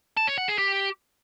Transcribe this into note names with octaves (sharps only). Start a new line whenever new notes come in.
A5
C#5
F#5
G#4
G4